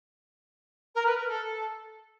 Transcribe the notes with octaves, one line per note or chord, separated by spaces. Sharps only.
A#4
B4
A#4
A4